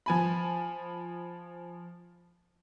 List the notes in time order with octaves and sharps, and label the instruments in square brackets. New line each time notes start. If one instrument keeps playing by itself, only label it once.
[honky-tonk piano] F3 G#5 B5